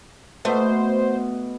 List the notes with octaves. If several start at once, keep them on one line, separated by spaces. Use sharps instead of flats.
B2 A3 B3 C5